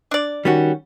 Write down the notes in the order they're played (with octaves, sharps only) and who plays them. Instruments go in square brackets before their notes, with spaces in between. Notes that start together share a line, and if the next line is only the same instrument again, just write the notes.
[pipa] D4 D5
[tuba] D#3 [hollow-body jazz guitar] G3 C#4 F#4